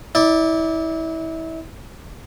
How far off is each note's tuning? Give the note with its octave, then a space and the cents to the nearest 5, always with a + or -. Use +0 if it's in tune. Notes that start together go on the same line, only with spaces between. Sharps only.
E4 -30 D5 +0